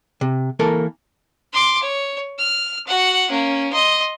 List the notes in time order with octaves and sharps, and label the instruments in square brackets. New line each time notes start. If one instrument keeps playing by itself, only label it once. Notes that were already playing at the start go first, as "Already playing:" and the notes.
[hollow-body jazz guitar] C3
E3 A#3 A4 A#4
[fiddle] C6 D6
C#5
F6
F#4 F#5
A#3 C#4
D#5 C6